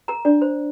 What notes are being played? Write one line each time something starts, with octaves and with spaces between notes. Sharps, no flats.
A#4 A#5
D4 D5
C5